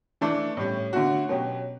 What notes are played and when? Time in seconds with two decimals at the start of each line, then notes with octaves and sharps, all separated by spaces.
0.21 E3 A3 D4
0.57 A2 G3 C#4
0.93 D3 A3 C#4 F#4
1.29 B2 F#3 C#4 G4